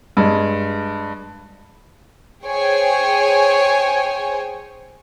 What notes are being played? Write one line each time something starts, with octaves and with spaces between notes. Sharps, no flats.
G2 G#3
G#4 C5 C#5 G5 G#5